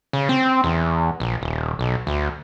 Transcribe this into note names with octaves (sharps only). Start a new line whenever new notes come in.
C#3
C4
E2
A#1
D#1
B1
D2